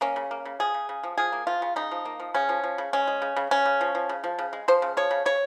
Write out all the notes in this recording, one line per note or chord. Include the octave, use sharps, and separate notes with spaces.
A#3 C#4
C#3
A#3
C#3
F3 G#4
C#3
C#3
F3
F3 G#4
A#3
F3 F4
C#3
C#3 D#4
F3
A#3
F3
C#3 C#4
F3
F3
C#3
G#3 C#4
G#3
C#3
C#3
C#3 C#4
C#3
F3
F3
C#3
F3
C#3
G#3
F3 C5
C#3
F3 C#5
C#3
C#3 C#5